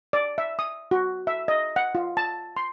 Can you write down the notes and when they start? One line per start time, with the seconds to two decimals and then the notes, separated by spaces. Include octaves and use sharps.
0.13 D5
0.38 E5
0.59 D#6
0.91 F#4
1.27 E5
1.48 D#5
1.76 F#5
1.95 F4
2.17 A5
2.57 C6